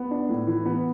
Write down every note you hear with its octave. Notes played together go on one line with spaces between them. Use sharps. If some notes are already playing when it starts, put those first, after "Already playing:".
Already playing: B3
D4
A2
E3
B3